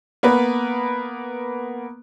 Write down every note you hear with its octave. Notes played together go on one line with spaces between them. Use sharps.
A#3 B3 B4